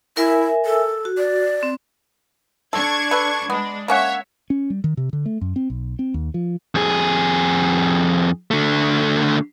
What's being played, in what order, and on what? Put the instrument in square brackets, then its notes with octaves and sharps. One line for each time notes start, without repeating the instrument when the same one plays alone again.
[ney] E4 [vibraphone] A#4 E5 G#5
[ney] A4
[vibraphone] F#4
[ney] D5
[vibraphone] C4
[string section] D4 C#6 G#6 [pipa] A4
[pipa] A4 B4
[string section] G#3 D4 [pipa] B3
[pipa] A#3 C#4 F#5 [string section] C#5 E5
[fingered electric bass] C#4
G3
D#3
C3
D3
A3
F#2
C4
B1
C4
D#2
F3
[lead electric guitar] F2 G#4
D3 A3